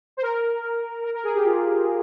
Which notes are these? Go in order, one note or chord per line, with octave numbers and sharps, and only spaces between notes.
C5
A#4
A#4
A#4
G#4
G4
F4